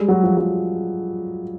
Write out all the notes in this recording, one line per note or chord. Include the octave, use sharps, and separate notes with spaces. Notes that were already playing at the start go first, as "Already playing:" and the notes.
Already playing: G3 G#3
F#3
F3
F#3